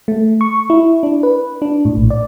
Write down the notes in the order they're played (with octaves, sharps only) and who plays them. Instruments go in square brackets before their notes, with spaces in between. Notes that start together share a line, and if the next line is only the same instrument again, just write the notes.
[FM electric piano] A3
C#6
E4
D4
B4
D4
A2
A#1
D5